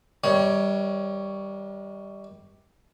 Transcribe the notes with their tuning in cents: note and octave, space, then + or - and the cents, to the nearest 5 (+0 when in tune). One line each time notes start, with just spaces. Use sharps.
D#3 +40 G3 +0 C#5 +10